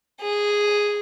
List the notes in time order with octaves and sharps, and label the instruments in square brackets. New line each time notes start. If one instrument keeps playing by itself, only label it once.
[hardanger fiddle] G#4